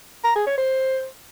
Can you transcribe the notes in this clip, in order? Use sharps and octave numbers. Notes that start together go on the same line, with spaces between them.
A#5
G#4
C#5
C5